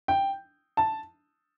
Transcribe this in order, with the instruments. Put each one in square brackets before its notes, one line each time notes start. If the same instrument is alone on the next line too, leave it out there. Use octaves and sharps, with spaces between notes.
[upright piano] G5
A5